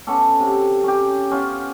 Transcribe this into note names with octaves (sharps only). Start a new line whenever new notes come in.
B3 C#4 A4 D6
C3
C#4 G4
B3 C#4 F4